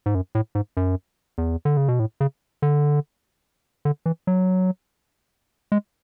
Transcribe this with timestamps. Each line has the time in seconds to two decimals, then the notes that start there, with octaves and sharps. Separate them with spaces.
0.06 G#2
0.15 F#2
0.35 A2
0.55 G#2
0.77 F#2
1.38 E2
1.65 D3
1.77 C#3
1.88 B2
1.99 A2
2.21 C#3
2.62 D3
3.85 D3
4.06 E3
4.27 F#3
5.72 G#3